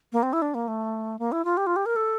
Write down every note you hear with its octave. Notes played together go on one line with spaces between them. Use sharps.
A#3
C4
E4
D4
A#3
A3
A#3
E4
F4
G4
F4
G4
A#4
A4